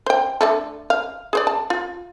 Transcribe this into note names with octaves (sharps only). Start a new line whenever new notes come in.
C5 G5
D3 A3 A4
F5
G#4 C5 D5
A5
F4